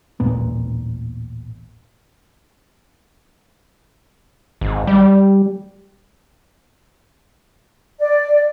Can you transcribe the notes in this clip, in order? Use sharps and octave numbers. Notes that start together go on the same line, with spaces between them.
A1 D#2 A#2 B3
G#1
G3
D5